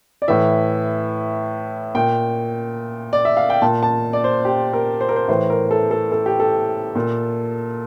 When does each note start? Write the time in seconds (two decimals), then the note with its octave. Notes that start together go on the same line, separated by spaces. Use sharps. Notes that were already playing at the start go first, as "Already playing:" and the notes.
0.22 D5
0.28 A2 E3 E5
1.95 A#2 G5
3.13 D5
3.25 E5
3.37 F5
3.50 G5
3.62 A#2 A5
3.83 A5
4.13 D5
4.24 C5
4.45 G4
4.73 A#4
5.01 C5
5.09 A#4
5.16 C5
5.28 A2 E3 C5
5.50 A#4
5.71 A4
5.91 A4
6.12 A4
6.26 G4
6.40 A4
6.96 A#2